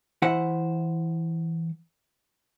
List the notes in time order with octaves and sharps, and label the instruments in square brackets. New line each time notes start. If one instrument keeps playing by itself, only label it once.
[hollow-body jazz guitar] E3 E4 C5 F#5